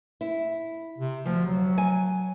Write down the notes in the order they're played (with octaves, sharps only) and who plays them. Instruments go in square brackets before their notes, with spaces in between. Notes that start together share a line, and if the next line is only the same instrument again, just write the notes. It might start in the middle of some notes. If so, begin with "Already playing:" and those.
[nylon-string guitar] E4
[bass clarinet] C3
[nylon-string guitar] D2 [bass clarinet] F3
[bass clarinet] F#3
[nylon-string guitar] G#5